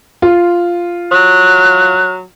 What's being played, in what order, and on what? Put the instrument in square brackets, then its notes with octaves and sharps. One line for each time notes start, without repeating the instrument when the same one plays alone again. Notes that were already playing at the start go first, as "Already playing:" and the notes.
[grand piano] F4
[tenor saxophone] F#3 [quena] F#6